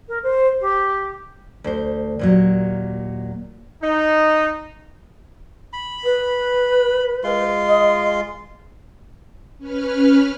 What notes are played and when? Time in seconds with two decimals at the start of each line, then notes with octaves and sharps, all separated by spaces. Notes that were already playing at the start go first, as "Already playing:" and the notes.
0.08 A#4
0.23 C5
0.61 G4
1.64 D2 C5
2.19 D#2 A#2 F#3
3.82 D#4
5.73 B5
6.04 B4
7.24 G#3 F4 C6
7.66 D#5
9.58 C#4 B4 F6